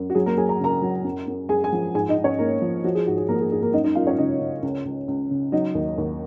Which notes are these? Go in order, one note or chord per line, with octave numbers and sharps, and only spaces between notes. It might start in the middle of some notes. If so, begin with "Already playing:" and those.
Already playing: F#2
F#4
F#3 G#4
A#3 A#4
F#3 G#4 G#5
A#5
C#3 A#4 A#5
F#3
F#2
F#2
F#2 G#4 G#5
G#4 G#5
F3
G#2 G#4 G#5
D#4 D#5
G#2
C#4 C#5
G#2 A#3 A#4
F3
F3 F#4
G#4
G#2 F#4
G#4
F3 A#3 A#4
G#4
G#2 G#4
A#3 A#4
F#2 D#4 D#5
D#4 D#5
F#2 F4 F5
C#4 C#5
C#3 D#4 D#5
C#3
C#2
C#2
C#2
C#3
F#3 D#4 D#5
D#2
D#2